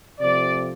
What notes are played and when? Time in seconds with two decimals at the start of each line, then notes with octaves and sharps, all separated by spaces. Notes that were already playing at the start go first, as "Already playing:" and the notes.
0.20 C3 F3 A3 D5